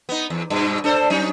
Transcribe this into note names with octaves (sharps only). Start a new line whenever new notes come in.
B3 D#4
E2
G2 B2
D4 A4 C5
F#3 C#4 D#4